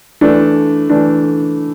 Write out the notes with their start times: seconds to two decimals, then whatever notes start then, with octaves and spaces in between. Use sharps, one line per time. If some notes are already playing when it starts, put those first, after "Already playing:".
0.21 E3 A3 D4
0.90 E3 A3 D4